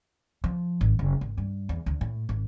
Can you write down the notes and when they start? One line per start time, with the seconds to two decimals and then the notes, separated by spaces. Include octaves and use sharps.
0.44 F3
0.81 G#1
0.99 F#1
1.21 G#1
1.37 G2
1.69 E2
1.86 D2
2.01 A2
2.29 G#1